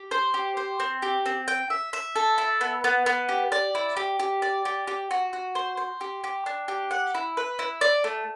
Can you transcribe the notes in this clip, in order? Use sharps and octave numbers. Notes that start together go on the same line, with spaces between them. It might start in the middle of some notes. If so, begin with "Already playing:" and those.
Already playing: G4
C5
G4
C5
C4
G4
C4
G5
E5
E5
A4
E4
B3
B3
B3
G4
D5
E4
G4
G4
D5
G4
G4
F#4
F#4
C5
C5
G4
G4
D4
G4
F#5
E4
B4
E4
D5
A3